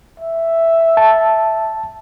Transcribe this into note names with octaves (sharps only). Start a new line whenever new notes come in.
E5
A5